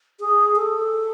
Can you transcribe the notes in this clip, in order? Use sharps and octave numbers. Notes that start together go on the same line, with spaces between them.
G#4
A4